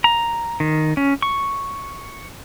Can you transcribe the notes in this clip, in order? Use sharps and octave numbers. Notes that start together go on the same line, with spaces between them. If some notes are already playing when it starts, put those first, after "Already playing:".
A#5
D#3
C#4
C#6